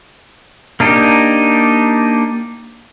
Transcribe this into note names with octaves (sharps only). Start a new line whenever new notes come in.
A#3 D4 D#4 G4